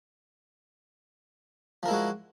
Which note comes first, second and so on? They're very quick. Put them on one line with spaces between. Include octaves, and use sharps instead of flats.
F3 A#4 E4 G#3 F#4